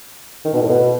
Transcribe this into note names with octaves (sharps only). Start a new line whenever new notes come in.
D#3
B2
A2
B2